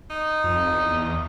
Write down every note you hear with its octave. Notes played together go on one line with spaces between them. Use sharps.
D#4
F2
E2